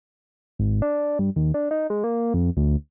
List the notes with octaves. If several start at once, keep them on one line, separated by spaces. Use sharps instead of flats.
G#1
D4
G2
D#2
D4
D#4
G#3
A#3
F2
D2